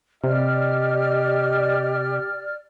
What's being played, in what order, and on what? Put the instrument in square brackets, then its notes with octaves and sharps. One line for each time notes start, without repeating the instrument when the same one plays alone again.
[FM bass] C3 [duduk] G4 [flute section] D5 F6 [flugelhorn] D#5